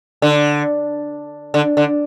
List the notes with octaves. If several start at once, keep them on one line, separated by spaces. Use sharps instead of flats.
D3
D3
D3